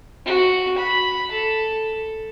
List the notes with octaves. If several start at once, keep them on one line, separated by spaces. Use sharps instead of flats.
F#4
B5
A4